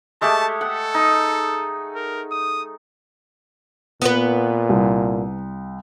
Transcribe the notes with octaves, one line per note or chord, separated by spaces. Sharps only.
G#3 A3 G4 A5
A4 F#5
D#4
A#4
D#6
A#2 B3 B4
C2